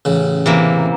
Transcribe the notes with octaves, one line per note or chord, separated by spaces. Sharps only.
A1 C#3
C3 E3 A#3